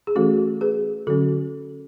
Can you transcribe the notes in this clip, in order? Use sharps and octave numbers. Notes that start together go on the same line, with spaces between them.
G#4
E3 A3 C#4 F#4 A4
G#4 B4
D3 F#3 C#4 F#4 A4